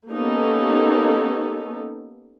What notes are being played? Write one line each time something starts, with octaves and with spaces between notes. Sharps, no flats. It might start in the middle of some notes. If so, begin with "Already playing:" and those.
A#3 B3 C#4 D#4 G4 A4